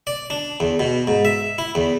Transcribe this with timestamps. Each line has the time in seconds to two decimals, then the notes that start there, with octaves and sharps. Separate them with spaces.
0.07 D5
0.30 D4
0.60 E2
0.80 B2
1.07 G#2
1.25 E5
1.58 E4
1.75 E2